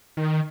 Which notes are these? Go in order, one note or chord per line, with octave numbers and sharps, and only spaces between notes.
D#3